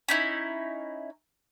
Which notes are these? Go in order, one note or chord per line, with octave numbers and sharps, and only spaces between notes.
C#4 D#4 E4